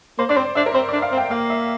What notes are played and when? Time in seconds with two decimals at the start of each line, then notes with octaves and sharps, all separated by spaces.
0.18 A#3 C5
0.29 D4 D5
0.36 C4 C5
0.55 D4 E5
0.66 A#4
0.74 C4 C5
0.89 D4 D5
1.02 F5
1.12 C4
1.17 G5
1.31 A#3 F5
1.50 E5